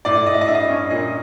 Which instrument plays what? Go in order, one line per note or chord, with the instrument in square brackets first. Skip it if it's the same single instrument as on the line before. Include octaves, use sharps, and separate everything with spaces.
[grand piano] A2 D5
A2 D#5
E5
D#5
G2 E5
D#5
C#4
A#2 D#5